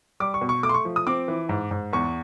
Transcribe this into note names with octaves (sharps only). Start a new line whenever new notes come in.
G3 D6
C#6
B2
C#6
A3 D6
C6
C#6
F3
D#6
C4 D6
E3
G#2
G#2
E2 C#6